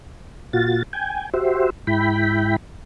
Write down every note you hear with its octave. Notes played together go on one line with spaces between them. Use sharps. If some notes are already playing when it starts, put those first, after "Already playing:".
A#2 F4 F#4 A6
G5 G#5
F#4 G4 C5 E5
G#2 E4 G5 B5